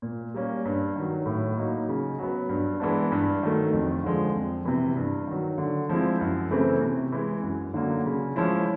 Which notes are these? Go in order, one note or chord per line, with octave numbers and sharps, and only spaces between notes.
A#2
G3 A#3 C#4
G2
D#3 F#3
A2
F#3 A#3 D#4
C#3
F#3 B3
G2
E3 G#3 B3 D4
G2
D#3 F#3 A3
F2
D3 F3 G#3
F2
C3 E3
G2
D#3 F#3
D3
F3 G#3 C4 E4
F#2
C#3 E3 A3 C4
C3
E3 G#3
F#2
D3 F#3 A#3
C#3
F3 G#3 C#4 E4